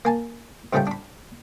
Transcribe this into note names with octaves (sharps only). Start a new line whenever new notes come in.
A#3 G#5 A5
G#2 C#3 F3 G3 A3 G5
D4 B5